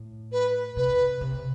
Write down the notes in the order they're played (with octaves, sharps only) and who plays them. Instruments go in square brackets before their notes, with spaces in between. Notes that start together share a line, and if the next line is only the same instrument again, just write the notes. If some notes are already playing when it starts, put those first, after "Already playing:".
Already playing: [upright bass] A2
[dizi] B4
[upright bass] C3 [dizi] B4
[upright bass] C3